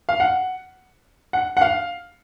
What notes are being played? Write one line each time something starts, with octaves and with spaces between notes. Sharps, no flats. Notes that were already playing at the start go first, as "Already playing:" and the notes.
F5
F#5
F#5
F#5
F5